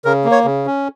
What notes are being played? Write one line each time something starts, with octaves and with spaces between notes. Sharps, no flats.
C#3 A#4
A#3
C#5
C#3
C#4